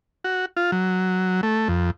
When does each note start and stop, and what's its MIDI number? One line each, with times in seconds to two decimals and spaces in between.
0.24 0.46 66
0.57 0.71 65
0.72 1.41 54
1.43 1.68 57
1.68 1.91 41